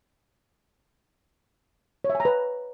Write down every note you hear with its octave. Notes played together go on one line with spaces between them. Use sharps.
C#5
E5
G#5
A#5
B4